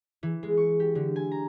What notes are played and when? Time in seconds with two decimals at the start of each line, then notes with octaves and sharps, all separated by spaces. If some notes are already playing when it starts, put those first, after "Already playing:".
0.23 E3
0.43 G#3
0.57 C#6
0.80 G4
0.95 D3
1.16 G#5
1.32 A#5